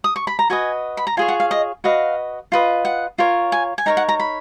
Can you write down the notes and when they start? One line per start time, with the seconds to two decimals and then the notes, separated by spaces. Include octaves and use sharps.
0.04 D#6
0.16 C#6
0.27 B5
0.39 A#5
0.50 F#4 B4 D#5 G#5
0.97 B5
1.07 A#5
1.17 F4 G#4 C#5 G#5
1.28 F#5
1.40 F5
1.51 D#5
1.84 F#4 B4 D#5 F5
2.52 F4 B4 D#5
2.85 F#5
3.18 F4 A#4 C#5
3.52 G#5
3.78 G#5
3.86 D#4 A#4 C#5 A#5
3.97 F#5
4.09 A#5
4.20 B5